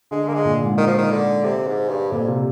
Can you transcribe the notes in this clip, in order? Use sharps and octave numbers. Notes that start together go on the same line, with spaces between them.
D3 G#3
D3 A#3
G#3
A#2
G#2
D#3
F3
D#3
D3
C3
G#2
G2
F2 A#2
C3